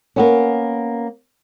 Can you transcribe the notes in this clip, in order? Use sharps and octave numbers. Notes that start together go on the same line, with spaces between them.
A#3 B3 C#4